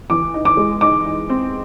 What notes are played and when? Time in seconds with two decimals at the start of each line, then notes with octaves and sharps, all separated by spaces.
0.10 E3 D6
0.34 D#4
0.45 D6
0.57 G#3
0.81 D#4 D6
1.06 D#4
1.29 C4